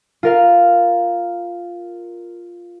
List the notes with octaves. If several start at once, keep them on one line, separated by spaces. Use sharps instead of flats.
F4 A#4 F5